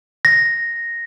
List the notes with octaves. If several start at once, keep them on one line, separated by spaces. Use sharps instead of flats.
A#6